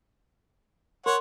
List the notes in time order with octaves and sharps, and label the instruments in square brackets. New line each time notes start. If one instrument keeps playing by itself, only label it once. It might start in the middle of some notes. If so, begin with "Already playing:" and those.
[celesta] A#4 C6 [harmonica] C#5 F#5